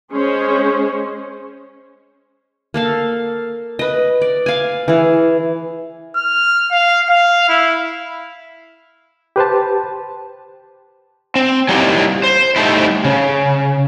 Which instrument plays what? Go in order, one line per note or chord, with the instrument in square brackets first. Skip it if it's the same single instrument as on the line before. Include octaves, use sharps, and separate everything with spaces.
[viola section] G#3 C#4 G#4 C5 C#5
[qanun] A#3 A4 F5
B4 D#5
D5
F5 G#5
E3 G#4
[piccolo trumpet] F6
F5
F5
E4
[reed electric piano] G4 B4 C5 A5
[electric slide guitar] C4
F#3 G3 A#3 D#4 E4 G4
C5
G3 A3 D#4 E4
C#3